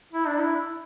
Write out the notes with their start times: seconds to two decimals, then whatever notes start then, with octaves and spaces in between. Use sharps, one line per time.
0.13 E4
0.27 D4
0.41 E4